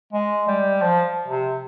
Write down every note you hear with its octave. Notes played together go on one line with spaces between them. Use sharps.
G#3
G3
F3
C3